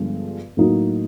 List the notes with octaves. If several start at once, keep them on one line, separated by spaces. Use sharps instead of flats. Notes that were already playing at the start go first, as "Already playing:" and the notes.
Already playing: G2 D3 F3 G#3 B3
A2 F#3 A#3 D#4 F#4